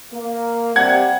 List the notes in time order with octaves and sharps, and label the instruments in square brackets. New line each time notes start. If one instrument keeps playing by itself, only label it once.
[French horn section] A#3
[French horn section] C3 G3 [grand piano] F#5 G#6